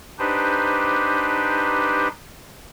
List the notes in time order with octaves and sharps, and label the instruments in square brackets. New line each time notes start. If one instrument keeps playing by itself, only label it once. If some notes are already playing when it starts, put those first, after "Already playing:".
[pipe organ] D4 D#4 G4 B4 C5